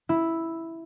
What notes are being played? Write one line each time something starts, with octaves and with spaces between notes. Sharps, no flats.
E4